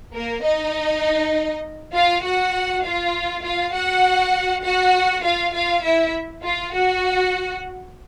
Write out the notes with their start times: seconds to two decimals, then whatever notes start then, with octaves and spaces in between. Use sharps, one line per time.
0.14 A#3 A#4
0.44 D#4 D#5
1.94 F4 F5
2.23 F#4 F#5
2.84 F4 F5
3.44 F4 F5
3.73 F#4 F#5
4.63 F#4 F#5
5.23 F4 F5
5.54 F4 F5
5.84 E4 E5
6.44 F4 F5
6.73 F#4 F#5